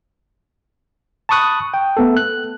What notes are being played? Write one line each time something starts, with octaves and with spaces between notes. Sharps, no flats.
A5 B5 C#6 D#6 F#6
G5
A3 B3 A4
F#6